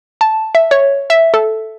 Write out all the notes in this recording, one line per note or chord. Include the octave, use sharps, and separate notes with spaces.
A5
E5
C#5
E5
A4